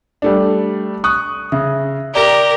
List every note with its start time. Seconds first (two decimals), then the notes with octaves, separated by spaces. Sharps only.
0.22 G3 A3 D4
1.04 C#6 D#6 F#6
1.52 C#3 E5
2.15 G4 A#4 D5 A#5